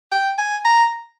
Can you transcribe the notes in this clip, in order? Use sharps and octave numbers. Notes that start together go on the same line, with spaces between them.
G5
G#5
A#5